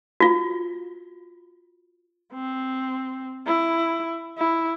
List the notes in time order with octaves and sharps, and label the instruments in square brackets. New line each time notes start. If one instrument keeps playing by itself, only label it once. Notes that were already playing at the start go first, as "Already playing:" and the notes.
[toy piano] F4 F#4
[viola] C4
E4
E4